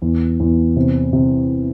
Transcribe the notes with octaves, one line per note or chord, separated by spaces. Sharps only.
E2
E2
C3
C3